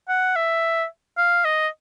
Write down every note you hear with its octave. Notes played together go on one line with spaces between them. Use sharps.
F#5
E5
F5
D#5